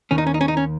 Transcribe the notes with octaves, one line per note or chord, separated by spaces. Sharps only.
D#2 D#3 C#4
D#4
C#4
D#4
C#4
D#4
C#4